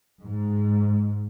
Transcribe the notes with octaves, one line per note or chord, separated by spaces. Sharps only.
G#2